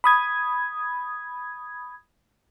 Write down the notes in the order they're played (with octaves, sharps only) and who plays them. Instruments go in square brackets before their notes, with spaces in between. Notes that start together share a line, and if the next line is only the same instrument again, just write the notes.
[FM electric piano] B5 D#6 G#6